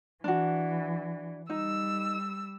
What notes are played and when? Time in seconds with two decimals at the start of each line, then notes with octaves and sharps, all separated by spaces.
0.24 E3 D4 F#4
1.50 G3 D#4 E6